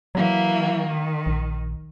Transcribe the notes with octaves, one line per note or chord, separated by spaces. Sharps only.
E3 F#3 A#3 F#4
D#3
A#1